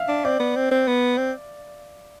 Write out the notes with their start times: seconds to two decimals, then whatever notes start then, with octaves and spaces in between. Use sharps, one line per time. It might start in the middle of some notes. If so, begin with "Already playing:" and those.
Already playing: E5 F5
0.08 D4
0.25 C4 D5
0.40 B3
0.56 C4
0.71 C4
0.87 B3
1.18 C4